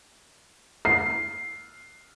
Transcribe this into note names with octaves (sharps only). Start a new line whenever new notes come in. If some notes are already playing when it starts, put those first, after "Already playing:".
C7